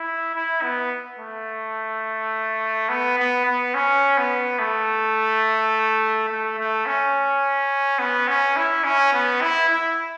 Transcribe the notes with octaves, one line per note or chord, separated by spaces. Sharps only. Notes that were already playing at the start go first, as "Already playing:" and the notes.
Already playing: E4
E4
B3
A3
B3
B3
B3
C#4
B3
A3
A3
A3
C#4
B3
C#4
E4
C#4
B3
E4
E4